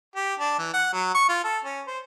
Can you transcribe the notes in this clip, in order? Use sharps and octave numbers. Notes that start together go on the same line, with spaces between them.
G4
D4
E3
F#5
F#3
C#6
F4
A4
C#4
C5